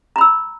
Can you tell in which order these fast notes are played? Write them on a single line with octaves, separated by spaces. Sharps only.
A#5 B5 E6